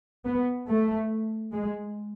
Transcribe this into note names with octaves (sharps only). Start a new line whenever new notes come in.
B3
A3
G#3